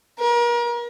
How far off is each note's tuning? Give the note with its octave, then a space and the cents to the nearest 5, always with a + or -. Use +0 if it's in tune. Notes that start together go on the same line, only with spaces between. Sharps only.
A#4 +35